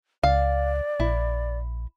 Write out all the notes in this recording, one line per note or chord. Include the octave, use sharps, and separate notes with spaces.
C#2 D5 F5
A#1 E4